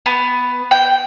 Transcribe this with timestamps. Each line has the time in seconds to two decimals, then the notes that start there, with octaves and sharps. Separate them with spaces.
0.06 B3
0.71 G5